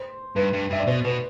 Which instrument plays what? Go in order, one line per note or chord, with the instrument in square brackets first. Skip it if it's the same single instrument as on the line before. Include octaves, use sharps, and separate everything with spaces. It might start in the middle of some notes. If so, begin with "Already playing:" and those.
Already playing: [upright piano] C5
[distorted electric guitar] G2 [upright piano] B4
[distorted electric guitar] G2
[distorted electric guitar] G2 [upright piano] E5
[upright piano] D5
[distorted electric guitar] B2 [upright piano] C5
[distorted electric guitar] B2 [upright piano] B4